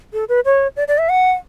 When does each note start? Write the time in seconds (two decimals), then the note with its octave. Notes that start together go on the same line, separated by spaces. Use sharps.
0.13 A4
0.29 B4
0.45 C#5
0.77 D5
0.88 D5
0.98 E5
1.09 F#5